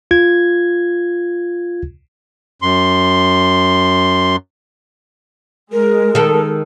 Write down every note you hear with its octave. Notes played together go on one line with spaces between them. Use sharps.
F4 G#6
F#2 C6
G#3 A#4
D#3 A4